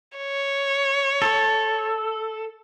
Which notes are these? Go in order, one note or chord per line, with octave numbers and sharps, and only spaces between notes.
C#5
A4